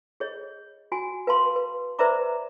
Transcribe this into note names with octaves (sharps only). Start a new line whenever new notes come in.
G#4 C#5 D#5
F#4 G#5
B4 F5 A5 C6
B4
B4 C5 D5 E5 A#5 D6